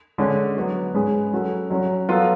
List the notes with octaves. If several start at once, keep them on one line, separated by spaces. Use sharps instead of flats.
D3 G#3 C#4
F#3 B3 F#4
G#2 G#3 C#4 G#4 B4
F#3 C#4 F#4 A4
F#3 C#4 F#4
F#3 B3 F4 A4